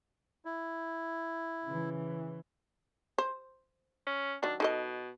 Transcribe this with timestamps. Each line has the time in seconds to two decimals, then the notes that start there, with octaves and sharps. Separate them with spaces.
0.45 E4
1.65 C#3 E3
3.18 C5
4.07 C#4
4.43 D#3 F#3 D4
4.60 B2 D#4 A4 D#5